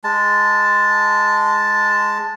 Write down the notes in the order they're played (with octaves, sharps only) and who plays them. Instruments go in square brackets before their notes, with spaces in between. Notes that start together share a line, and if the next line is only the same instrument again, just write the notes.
[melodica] G#3 A5